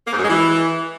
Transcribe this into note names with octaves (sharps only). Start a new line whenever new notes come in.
A#3
G#2
F#2
G#3
E3